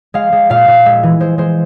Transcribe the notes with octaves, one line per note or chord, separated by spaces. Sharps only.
G#3 F5
G#3
A#2 F5
A#2
G#3 E5
E3
G#3 C5
G#3 C5